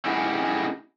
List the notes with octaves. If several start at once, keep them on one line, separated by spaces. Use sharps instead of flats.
C#4 E4 G4 G#4 D#5 F#5